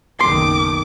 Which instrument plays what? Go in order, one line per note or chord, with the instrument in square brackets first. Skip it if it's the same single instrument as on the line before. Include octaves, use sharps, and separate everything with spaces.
[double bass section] F#1 B1 D#3 [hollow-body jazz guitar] C6 [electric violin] D6